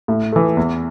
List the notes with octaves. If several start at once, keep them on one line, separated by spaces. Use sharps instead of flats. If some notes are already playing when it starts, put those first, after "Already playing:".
A2
E3 A3
E2